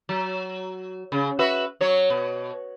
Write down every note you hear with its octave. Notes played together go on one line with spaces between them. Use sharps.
F#3
C#3
F#4 B4 E5
F#3 C#5
B2